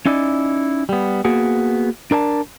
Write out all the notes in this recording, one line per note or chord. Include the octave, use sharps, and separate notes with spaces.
C#4 D#4 E4 D5
G3 B3
A#3 B3 F#4 G#4
D4 A#4 D5 A5